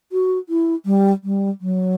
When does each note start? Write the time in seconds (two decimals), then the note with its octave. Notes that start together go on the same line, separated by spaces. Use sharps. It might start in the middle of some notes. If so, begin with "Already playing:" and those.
0.12 F#4
0.49 E4
0.86 G3
1.24 G3
1.61 F#3